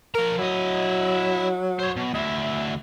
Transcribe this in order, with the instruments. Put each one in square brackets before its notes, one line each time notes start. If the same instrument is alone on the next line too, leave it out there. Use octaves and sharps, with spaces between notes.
[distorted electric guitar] F3 A#5 [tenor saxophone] A#4
[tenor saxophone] F#3 [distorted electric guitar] E4 D#5
[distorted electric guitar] C5 C#5
B2
[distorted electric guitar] D2 E4 [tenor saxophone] E5